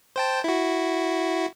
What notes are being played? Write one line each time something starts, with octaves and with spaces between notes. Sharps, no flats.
C5 G5 A5
E4 F#4